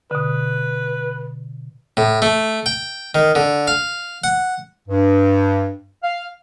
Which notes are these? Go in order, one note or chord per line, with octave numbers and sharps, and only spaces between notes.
B2 D3 B4
A2
A3
G5
D#3
D3
F5
F#5
G2
F5